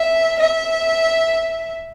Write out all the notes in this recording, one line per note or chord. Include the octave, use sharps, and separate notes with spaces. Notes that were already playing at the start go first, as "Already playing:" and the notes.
Already playing: E5
E5